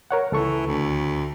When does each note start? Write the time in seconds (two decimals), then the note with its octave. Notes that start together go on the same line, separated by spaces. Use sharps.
0.11 A#4 C#5 F#5
0.32 C#2 E3 A4 C#6
0.66 D2